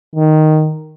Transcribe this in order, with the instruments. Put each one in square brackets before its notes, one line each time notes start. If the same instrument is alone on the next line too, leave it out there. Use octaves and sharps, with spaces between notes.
[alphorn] D#3